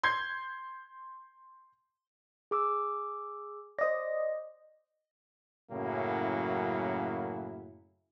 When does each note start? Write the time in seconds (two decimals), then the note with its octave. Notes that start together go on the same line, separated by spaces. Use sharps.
0.03 C6 G6 G#6 C7
2.51 G#4 D6 E6
3.79 C5 D5 D#5 A#6
5.71 F#2 A2 C#3 F#3 A#3 E4